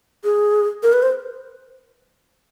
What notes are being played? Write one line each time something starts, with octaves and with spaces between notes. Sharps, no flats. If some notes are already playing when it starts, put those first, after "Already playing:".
G#4
A#4
B4
C5